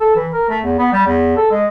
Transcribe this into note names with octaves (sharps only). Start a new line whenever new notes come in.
A4
E3
A#4
A3
E2
B3
G3
E2
A4
G#3